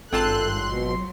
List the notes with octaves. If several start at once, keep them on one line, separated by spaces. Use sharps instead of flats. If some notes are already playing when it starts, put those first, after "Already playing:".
G#1 G2 C4 F4 A4 A5 C6 F#6
B2 F#3